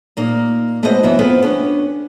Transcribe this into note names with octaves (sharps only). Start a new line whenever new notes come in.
A#2 A#3 D#4
G#3 A3 B3 F#4 C5 D#5
F#2 E3 B3 B4 E5
B3 C4 F4 A4 B4
B3 C#4 D4